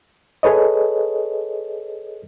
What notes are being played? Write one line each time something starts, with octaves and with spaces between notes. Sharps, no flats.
G#4 A4 B4 C#5 D#5